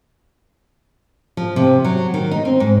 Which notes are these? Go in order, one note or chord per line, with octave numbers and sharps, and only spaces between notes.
F3
C3
F#3
D#3
D#4
C4
G#2